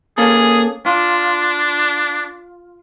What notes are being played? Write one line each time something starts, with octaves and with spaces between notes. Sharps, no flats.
A#3 C#4 G#4 A4
D4 F4